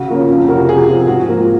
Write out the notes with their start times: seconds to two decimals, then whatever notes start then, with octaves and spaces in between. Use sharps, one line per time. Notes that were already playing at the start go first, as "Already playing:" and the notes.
Already playing: C#3 F#4
0.08 F3 A#3 C#4
0.28 F2
0.48 C3 F3 F#4 A#4
0.68 C3 F4 G#4
0.88 F3 C4
1.08 G#2 F#4
1.28 F3 A#3